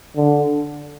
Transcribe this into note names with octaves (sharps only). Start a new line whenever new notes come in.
D3